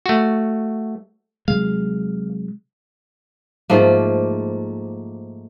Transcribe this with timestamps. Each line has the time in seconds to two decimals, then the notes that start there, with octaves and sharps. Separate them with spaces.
0.06 A3 F#4
1.48 C3 F#3 G#3 F5
3.70 G#2 F3 A3 A#3